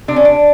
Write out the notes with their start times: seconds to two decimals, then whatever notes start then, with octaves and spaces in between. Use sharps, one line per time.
0.08 C3 D4
0.16 C#4
0.25 D4